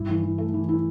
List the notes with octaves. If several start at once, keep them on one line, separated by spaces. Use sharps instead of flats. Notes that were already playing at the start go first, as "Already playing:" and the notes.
Already playing: G2 E4
E3
E3
A3
E3
E4